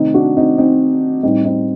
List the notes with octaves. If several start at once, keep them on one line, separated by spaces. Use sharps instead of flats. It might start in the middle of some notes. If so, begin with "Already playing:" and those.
Already playing: C3 D#3 A3 C4 D#4
D4 F#4
C4 D#4
C4 D#4
A2 G3 C4 D#4
C4 D#4